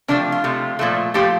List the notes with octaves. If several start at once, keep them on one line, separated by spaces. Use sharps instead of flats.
C3 F3 A3 D4
F4
C3 F3 A3
A#2 F3 A3
A#2 F3 A3 G4